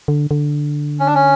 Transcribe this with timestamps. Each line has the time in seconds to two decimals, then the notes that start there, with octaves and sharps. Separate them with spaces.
0.08 D3
0.31 D3
1.00 C#4
1.07 D4
1.15 C#4